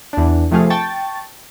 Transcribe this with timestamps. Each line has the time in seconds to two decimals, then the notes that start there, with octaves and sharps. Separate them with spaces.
0.13 E2 D4
0.51 C3 F3 A3 G#4 F5
0.70 G5 A5 C#6 A6